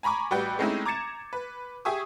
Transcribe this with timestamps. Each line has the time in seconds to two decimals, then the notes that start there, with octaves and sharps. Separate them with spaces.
0.03 G#5 A#5 B5 C#6 D6
0.31 A1 G3 F#4 B4 G5 G6
0.59 G#3 A3 C4 C#4 D#4 E4
0.85 A#5 D6 G#6 A6 C#7 E7
1.33 B4
1.85 G4 G#4 E5 G#5 C#6 D#6